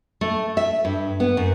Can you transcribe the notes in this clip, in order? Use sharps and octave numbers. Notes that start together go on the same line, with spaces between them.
A3
E5
G2
B3
F#2